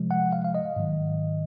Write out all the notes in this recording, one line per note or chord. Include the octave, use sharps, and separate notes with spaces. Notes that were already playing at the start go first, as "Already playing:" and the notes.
Already playing: C3 F3 G#3
F#5
F5
F5
D#5
G#2 D#3 F#3